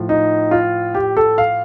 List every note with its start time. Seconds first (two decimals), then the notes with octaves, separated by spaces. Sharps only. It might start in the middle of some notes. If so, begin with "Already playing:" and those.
Already playing: A2 F3
0.09 D#4
0.51 F4
0.94 G4
1.17 A4
1.38 F5